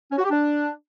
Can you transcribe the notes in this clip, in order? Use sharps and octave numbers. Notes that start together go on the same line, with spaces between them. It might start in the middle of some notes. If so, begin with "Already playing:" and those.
C#4
F#4
G4
D4